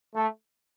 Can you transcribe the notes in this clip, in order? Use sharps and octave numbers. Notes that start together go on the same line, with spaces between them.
A3